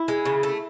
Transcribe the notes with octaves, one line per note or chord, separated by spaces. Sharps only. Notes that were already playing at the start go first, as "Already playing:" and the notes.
Already playing: E4
G#3
C#3
A3